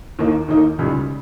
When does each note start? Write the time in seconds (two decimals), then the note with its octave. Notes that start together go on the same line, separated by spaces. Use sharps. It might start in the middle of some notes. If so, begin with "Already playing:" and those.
0.19 D#2 D#3 A#3 D#4
0.48 D#2 D#3 A#3 D#4
0.79 C#2 C#3 G3